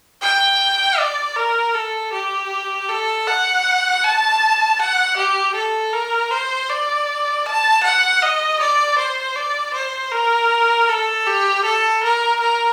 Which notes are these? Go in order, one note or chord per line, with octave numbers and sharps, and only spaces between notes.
G5
D5
A#4
A4
G4
A4
F#5
A5
F#5
G4
A4
A#4
C5
D5
A5
F#5
D#5
D5
C5
D5
C5
A#4
A4
G4
A4
A#4
A#4